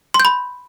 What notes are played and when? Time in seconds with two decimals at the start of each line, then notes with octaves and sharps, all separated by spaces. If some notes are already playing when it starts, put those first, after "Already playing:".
0.14 C6
0.20 G6
0.25 B5